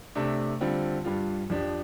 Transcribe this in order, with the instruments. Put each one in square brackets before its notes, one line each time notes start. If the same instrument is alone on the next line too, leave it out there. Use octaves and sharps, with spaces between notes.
[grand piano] C3 A3 D4
D3 G3 C4 F4
G2 G3 F4
F2 F3 D4 G4